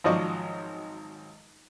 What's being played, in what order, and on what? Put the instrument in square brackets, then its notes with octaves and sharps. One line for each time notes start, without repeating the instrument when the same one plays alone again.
[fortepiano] G#1 F3 F#3 D5 D#5 C#6